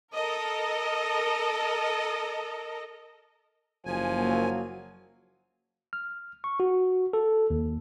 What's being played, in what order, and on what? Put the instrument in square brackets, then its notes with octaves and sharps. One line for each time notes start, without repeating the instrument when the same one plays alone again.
[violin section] A4 A#4 D#5
[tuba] F#1 [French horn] F3 [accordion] G#5
[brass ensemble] F#3 A#3
[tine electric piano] F6
C#6
F#4
A4
D#2